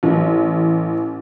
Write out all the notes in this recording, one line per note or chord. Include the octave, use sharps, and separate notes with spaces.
A1